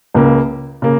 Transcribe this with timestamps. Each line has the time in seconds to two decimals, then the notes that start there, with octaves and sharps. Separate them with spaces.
0.14 C#2 C#3 A#3
0.82 C#3 A#3